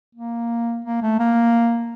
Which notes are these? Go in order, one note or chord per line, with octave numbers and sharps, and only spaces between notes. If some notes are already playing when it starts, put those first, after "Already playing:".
A#3
A#3
A3
A#3